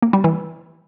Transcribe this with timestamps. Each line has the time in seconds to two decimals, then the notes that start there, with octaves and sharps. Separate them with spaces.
0.02 A#3
0.13 G3
0.24 E3